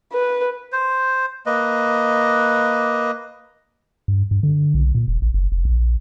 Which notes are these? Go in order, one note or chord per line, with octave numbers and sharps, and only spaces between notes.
B4
C5
A#3 B4 D#5
G2
G2
D3
B1
A#2
E1
A1
F#1
F1
A#1